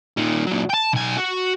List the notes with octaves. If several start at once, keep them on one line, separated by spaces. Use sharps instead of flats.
A#2 D#3
A#2 F#3
G5 A5
B1 G#5
F#4